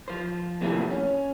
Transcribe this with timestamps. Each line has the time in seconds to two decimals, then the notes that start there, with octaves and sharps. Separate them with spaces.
0.08 F3 C5
0.61 D#2 C3 E3 F3 G#3 A3
0.91 C#4